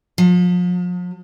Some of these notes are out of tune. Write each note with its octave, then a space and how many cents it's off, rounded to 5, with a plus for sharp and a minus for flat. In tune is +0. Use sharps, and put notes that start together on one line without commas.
F3 +40